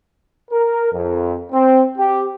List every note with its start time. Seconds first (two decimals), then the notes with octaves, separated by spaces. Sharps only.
0.51 A#4
0.93 F2
1.52 C4
1.97 G4